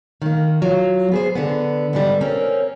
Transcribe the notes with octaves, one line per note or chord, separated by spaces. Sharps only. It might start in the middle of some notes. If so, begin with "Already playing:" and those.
D#3 A#3
F#3 F4
B3 G#4 C5
D3 B3
G#2 D3 G3
A#3 C4 C#4 A#4